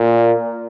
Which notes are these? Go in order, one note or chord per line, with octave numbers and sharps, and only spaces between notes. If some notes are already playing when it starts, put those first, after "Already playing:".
Already playing: A#2